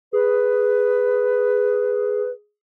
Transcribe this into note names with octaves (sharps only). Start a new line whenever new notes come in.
G#4 B4